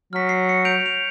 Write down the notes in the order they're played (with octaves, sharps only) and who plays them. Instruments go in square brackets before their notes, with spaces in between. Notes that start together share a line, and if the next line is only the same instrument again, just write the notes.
[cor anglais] F#3 [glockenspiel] F6 B6
[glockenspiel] C7
C#7
G6 D7 F7
F7